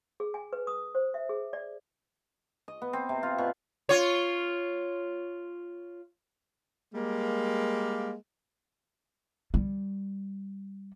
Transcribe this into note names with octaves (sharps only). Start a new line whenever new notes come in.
G#4
G#5
B4
D#6
C5
E5
G#4
D5
D#5
B3
C4
C3
F4
B2
F4 C#5
G3 G#3 A#3
G3